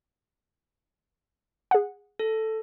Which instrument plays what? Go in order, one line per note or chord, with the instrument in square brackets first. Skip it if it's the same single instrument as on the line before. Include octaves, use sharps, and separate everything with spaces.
[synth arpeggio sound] G#4 F#5
[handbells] A4